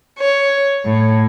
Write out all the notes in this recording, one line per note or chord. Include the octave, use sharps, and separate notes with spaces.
C#5
A2